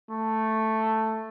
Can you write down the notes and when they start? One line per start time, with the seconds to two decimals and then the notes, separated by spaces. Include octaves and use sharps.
0.10 A3